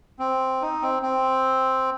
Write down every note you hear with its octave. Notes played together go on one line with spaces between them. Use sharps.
C4
D#4
C4
C4